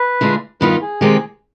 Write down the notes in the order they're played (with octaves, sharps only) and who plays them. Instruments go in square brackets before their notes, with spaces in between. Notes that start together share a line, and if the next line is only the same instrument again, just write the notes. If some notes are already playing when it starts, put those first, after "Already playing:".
Already playing: [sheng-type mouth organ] B4
[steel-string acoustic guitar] D3 G#3 D4 F4
[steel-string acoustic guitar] G2 D#3 B3 F4 [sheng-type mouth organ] B4
[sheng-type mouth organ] G#4
[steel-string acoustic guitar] C3 D#3 G#3 C4 G4